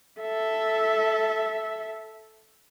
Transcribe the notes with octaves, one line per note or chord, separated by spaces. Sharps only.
A4 E5